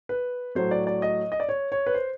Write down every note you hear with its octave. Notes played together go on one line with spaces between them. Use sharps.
B4
A2 F#3 A3 C5
D5
D5
D#5
D#5
D5
C#5
C#5
B4
C5